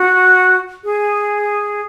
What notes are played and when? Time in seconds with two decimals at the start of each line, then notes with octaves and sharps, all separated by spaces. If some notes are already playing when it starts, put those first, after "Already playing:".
Already playing: F#4
0.84 G#4